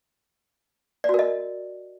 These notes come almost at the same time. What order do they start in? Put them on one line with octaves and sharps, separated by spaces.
D5 F#4 A#4 D#5